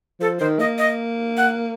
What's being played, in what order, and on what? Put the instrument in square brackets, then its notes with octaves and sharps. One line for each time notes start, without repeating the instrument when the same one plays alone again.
[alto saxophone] F3 [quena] A4
[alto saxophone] D#3 [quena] C5
[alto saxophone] A#3 [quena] D#5
[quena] D#5
F#5